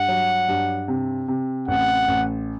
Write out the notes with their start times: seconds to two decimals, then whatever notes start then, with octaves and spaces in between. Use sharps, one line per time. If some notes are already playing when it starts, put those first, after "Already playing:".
Already playing: G2 F#5
0.08 F#3
0.48 G2
0.88 C3
1.28 C3
1.68 A1 F#5
2.08 A1